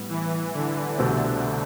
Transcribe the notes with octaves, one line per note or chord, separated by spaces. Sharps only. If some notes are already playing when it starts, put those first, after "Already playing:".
Already playing: A2 G3 B3
E3
D3
C2 B2 D3 A3 C4